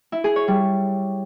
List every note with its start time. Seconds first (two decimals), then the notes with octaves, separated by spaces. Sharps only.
0.12 E4
0.24 G#4
0.36 C#5
0.48 G3